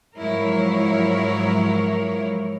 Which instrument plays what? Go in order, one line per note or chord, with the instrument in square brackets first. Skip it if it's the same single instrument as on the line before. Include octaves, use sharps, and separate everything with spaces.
[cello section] G#2 F3 F#3 E4 A#4 C#5